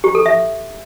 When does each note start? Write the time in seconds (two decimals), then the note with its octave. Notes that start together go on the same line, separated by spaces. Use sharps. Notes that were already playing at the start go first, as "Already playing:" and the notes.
0.04 G4
0.15 A4
0.26 E5